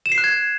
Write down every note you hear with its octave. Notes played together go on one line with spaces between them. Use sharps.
E7
C7
F#6
G#6